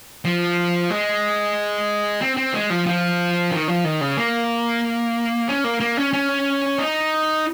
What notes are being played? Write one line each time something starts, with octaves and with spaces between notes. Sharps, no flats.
F3
G#3
C4
C4
G#3
F3
F3
D#3
F3
D#3
C#3
A#3
C#4
A#3
A#3
C#4
C#4
D#4